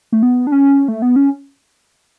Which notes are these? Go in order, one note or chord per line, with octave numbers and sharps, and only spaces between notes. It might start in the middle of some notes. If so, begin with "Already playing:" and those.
A3
B3
D4
C#4
A3
B3
C#4